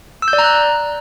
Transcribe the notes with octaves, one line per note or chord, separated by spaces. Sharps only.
E6
G6
D5
A#5
F#6